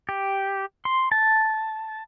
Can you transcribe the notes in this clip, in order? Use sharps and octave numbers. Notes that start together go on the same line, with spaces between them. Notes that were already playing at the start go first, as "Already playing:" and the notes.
G4
C6
A5